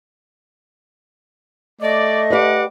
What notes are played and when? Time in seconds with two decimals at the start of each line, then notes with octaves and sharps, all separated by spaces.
1.81 A3 D5 D#5
2.30 G4 B4 D5 F#5 D6